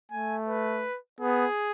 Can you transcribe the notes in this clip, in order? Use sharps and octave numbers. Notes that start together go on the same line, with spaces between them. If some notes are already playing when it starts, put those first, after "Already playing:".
A3 G#5
B4
B3 G#4